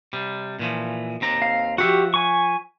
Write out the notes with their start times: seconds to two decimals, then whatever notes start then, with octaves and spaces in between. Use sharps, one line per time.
0.13 C3 G3
0.59 A#2 E3 F3
1.21 D#2 C4 A#5
1.42 F5
1.78 F3 F#4 G4 E5 F#5
2.14 G#5 C#6